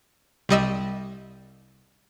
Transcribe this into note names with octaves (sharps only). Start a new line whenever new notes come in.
C2 G3 D#5 E6